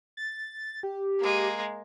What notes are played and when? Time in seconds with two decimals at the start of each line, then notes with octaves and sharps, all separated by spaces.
0.17 A6
0.83 G4
1.20 G#3 A#3